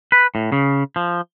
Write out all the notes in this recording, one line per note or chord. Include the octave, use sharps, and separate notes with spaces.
B4
A2
C#3
F3